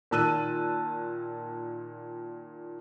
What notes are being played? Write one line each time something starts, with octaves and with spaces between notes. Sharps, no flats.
A#2 D#3 A5 E6 F#6 D#7